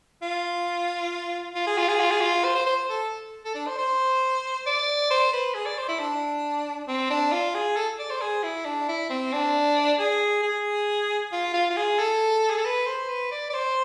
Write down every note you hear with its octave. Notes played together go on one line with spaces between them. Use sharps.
F4
F4
G#4
F4
G#4
F4
G#4
F4
C5
C5
C5
A4
A4
D4
C5
C5
D5
C5
B4
G#4
D5
C5
E4
D4
C4
D4
F4
G#4
A4
D5
C5
G#4
E4
D4
E4
C4
D4
G#4
G#4
F4
F4
F4
G#4
A4
G#4
A4
B4
C5
B4
D5
D5
C5